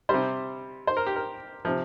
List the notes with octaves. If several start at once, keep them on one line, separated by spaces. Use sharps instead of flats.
C3 G3 C5
C5
A#4
G4
A#4
C3 F3